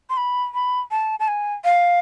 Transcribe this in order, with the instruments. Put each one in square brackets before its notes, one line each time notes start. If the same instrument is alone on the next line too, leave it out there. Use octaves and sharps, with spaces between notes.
[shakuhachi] C6
B5
B5
A5
A5
G#5
F5